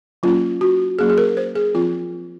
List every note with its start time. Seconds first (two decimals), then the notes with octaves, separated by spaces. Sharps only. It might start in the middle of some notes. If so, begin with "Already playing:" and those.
0.23 F#3 A#3 C#4 F4
0.61 F#4
0.99 F#3 A#3 C#4 G#4
1.10 G#4
1.18 A#4
1.37 C5
1.55 G#4
1.75 F3 C4 F4